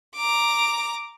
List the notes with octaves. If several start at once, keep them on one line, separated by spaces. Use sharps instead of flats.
A#5 D6